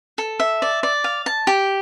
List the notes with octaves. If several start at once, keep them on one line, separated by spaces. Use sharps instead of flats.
A4
E5
D5
D5
F5
A5
G4